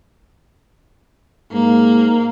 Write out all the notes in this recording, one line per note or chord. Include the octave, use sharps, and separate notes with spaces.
G#2 A#3